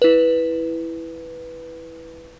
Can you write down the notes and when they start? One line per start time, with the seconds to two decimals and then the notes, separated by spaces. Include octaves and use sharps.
0.02 E4 B4